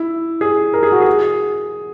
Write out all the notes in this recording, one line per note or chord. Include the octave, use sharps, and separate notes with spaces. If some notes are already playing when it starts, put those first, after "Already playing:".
Already playing: E4
G#4
A#4
G#4
F#4
G#4